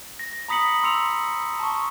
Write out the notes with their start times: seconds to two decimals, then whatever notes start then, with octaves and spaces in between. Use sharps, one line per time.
0.19 A#6
0.48 A#5 B5 D#6 B6 C#7 F#7
0.83 C6 E6 C#7 F7
1.59 A5 C#6